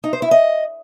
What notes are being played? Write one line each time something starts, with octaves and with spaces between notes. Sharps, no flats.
D#4
C5
E4
D#5